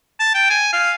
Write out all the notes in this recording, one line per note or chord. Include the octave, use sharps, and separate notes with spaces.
A5
G5
G#5
F5